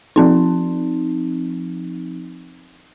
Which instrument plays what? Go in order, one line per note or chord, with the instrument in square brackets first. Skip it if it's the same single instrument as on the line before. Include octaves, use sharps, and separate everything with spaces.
[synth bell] F3 C4 D#4